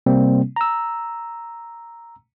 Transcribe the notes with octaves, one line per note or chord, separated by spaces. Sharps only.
C3 G3 A#3 C4
A#5 E6